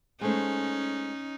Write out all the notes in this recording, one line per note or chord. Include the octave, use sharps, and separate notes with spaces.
G#3 A3 C#4 D#4 C5